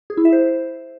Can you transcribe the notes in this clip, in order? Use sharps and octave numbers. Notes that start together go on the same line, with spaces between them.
G#4
E4
E5
C5